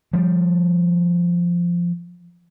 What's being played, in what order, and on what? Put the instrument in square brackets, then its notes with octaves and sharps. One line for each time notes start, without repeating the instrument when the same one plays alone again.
[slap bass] F3 G3